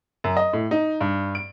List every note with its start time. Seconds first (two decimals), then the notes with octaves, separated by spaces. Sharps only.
0.24 F#2
0.37 D#5
0.53 A2
0.71 D#4
1.01 G2
1.35 D7